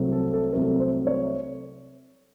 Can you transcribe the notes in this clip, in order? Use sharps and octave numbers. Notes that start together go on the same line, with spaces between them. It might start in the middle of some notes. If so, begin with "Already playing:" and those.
Already playing: C2 C3 F#3 A3 C4
A4
A4
C2 C3 F#3 A3 C4 A#4
C5
C#5